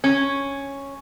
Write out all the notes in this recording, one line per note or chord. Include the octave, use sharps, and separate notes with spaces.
C#4